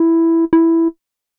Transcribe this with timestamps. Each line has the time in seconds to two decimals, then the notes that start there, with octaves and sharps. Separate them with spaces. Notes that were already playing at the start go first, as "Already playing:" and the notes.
Already playing: E4
0.53 E4